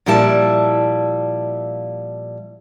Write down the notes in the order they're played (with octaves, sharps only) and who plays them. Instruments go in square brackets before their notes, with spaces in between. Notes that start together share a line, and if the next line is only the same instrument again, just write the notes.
[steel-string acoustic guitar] A#2 F3 G3 E4 A5